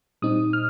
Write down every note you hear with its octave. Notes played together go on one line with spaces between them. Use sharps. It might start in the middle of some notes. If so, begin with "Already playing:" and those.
A#2 G3 C4 D#4 D#6
F6